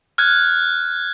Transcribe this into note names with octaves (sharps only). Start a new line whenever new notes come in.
F6 F#6 G#6